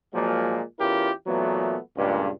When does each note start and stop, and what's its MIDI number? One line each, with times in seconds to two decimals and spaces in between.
0.13 0.61 46
0.13 0.61 53
0.13 0.61 54
0.13 0.61 56
0.13 0.61 58
0.79 1.10 40
0.79 1.10 61
0.79 1.10 64
0.79 1.10 65
0.79 1.10 67
0.79 1.10 70
1.26 1.77 46
1.26 1.77 52
1.26 1.77 54
1.26 1.77 57
1.26 1.77 59
1.97 2.29 37
1.97 2.29 43
1.97 2.29 46